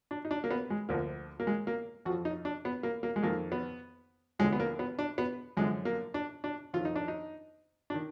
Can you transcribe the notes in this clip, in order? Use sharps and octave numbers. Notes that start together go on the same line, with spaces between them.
D4
D#4
D4
A#3
B3
G#3
D2 D3 F3 A#3
A#3
G#3
A#3
F2 F3 F#4
D#4
D4
B3
A#3
A#3
G#3
F2 D#3 A#3
B3
D#2 D3 F3 G#3
B3
A#3
B3
D4
B3
F#2 D3 F3 G#3
A#3
D4
D4
F2 D#3 F4
D#4
D4
D#4
D4
D#3